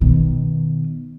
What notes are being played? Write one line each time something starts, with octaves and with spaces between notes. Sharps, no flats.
B2 D#3